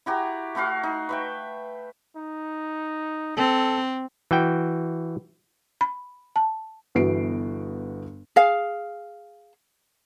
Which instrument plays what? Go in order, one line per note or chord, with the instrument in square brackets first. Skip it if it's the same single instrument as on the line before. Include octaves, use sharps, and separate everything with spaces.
[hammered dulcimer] E4 F#4 G4 A#5
A3 E4 F#4 F5
D#4
B4 E5 G5
[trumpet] D#4
[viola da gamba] C4 [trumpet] A4
[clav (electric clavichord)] E3 F#4 G5
[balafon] B5
A5
[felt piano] G1 E3 B3 F#4 C7 D7
[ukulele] G#4 F5